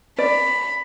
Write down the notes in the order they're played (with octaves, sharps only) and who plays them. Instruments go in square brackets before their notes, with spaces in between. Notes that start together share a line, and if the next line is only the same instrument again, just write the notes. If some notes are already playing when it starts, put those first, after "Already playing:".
[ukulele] D5 [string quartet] B5